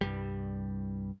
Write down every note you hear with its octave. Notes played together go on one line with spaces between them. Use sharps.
C2 G2 G3